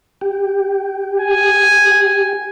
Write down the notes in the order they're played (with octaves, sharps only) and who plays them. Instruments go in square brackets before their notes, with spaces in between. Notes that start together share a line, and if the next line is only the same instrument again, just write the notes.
[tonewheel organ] G4
[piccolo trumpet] G#5